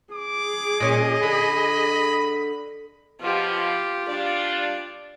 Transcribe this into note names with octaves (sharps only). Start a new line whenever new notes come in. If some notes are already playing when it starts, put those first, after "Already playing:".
G#4 D6
A#2 C#4 D#5
D3 B5
B2 F3 F4 G4
G3 D4 F4 D5